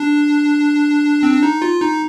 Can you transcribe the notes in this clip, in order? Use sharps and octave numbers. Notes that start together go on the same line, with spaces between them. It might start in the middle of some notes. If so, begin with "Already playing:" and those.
Already playing: D4
C4
D4
D#4
F4
D#4